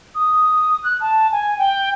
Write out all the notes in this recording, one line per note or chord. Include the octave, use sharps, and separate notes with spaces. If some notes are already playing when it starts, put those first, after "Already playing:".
D#6
F#6
A5
G#5
G5